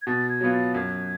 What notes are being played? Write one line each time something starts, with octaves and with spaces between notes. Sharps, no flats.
G#6
B2 A6
G#6
F#3 B3 F4
A6
F#2 G#6